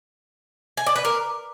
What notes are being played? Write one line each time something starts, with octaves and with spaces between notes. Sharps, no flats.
G#5
D5
B4
A#4